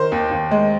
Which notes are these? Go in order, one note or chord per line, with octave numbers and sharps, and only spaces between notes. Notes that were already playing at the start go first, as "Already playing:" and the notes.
Already playing: D#3 C5
D#2
D#2
G#3